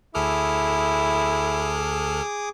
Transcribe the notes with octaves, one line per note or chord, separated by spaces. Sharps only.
D2 E4 G#4 A4 D6 D#6 F6